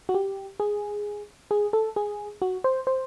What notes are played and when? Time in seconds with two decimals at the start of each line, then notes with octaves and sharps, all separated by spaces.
0.09 F#4
0.14 G4
0.60 G#4
1.51 G#4
1.73 A4
1.96 G#4
2.42 F#4
2.64 C5
2.87 C5